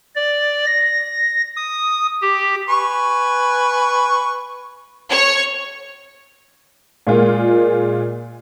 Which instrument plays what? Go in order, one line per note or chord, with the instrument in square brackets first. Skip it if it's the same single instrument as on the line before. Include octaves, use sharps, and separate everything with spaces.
[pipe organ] D5
A#6
D#6
G4
[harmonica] B4 G#5 C#6
[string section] C#5
[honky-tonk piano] A#2 G#3 A#3 F4